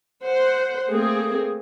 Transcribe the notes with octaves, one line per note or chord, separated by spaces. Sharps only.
C5 F#5
A3 A#3 C4 G#4